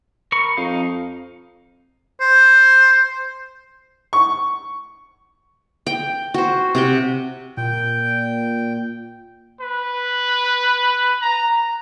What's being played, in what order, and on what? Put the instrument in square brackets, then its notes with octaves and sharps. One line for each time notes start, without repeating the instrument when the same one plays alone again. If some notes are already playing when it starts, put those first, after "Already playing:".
[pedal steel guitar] A#4 B5 C#6
[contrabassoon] F2 [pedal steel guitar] D#4 F5
[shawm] C5
[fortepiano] C#6
[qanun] G5
F#4 C5
C3 F#5 G5
[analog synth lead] A#2 [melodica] G5
[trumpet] B4
A#5